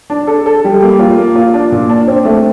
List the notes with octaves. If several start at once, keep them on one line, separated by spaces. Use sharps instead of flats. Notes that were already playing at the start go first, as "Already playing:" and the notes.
D4
A4
A4
G3
A#3
F4
A#3
F4
D4
A#2
D4
C4
A3